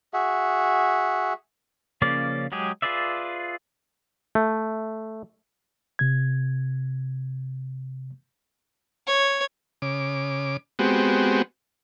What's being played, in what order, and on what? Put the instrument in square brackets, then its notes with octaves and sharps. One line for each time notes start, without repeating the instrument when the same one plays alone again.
[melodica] F#4 G#4 E5 F#5
[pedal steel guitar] C#3 F3 A#3 C#4 D5
F#3 G#3 G4 G#4
F4 G#4 B4 D5 E5
[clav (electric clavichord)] A3
[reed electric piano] C3 G#6
[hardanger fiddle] C#5
[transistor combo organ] C#3 D6
G#3 B3 C4 F#4 G4